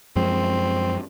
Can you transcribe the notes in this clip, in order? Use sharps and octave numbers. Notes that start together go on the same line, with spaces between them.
F#2 F3 G#3 C4